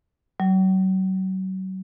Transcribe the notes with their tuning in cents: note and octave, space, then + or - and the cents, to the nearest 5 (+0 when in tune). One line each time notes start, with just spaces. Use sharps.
F#3 +35